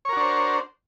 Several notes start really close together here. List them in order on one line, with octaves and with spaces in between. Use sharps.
C#5 A#4 F#4 D4 C5